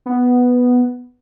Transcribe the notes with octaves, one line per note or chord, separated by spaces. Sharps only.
B3